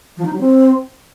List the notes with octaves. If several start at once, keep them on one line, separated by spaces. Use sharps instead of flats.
F3
D#4
F#3
C4